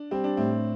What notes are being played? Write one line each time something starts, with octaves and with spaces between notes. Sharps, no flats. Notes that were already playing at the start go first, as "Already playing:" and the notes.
Already playing: D4
G3 C4
D4
A2 C4